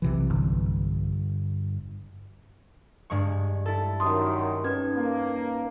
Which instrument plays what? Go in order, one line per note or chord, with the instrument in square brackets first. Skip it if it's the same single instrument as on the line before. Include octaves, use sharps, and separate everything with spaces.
[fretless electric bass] B1 C3 E3
[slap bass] G1
[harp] G2 G#3 C#6
E4 A4
[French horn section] F#2 D#3 [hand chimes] C6 D#6
[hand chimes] C#4 D#4 B4 [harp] G#6
[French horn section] A#3